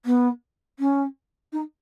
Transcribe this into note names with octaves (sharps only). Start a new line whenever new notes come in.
B3
C#4
D#4